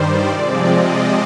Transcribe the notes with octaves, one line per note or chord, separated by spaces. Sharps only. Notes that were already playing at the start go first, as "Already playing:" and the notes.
Already playing: G2 D#3 G3 C5 D5
C3 F3 G#3 C4 D5
D#5